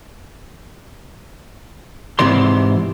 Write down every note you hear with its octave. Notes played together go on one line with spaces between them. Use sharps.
G#2 C3 E3 D5 C6